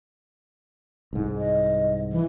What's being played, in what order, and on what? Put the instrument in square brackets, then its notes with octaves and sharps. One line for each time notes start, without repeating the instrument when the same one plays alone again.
[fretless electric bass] C2 G#2
[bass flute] D#5
E3